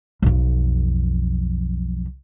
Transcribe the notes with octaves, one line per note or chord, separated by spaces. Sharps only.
B1 F2